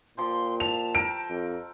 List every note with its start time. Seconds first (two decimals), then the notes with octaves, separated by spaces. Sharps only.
0.18 A#2 F3 G4 C6
0.60 A5 F7
0.95 A4 A#4 G5 D7
1.29 F2